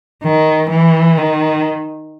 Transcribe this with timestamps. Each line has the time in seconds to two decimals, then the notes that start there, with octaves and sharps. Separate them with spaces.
0.23 D#3
0.70 E3
1.17 D#3